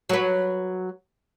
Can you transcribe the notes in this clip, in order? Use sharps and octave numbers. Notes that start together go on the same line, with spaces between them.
F#3 B4